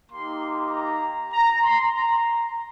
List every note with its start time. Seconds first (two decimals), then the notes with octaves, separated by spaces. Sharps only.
0.11 A#3 D#4 G4 C6
0.71 A#5
1.31 A#5
1.61 C6
1.92 A#5